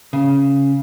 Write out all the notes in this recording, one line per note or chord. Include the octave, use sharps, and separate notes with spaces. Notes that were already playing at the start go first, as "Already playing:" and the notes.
C#3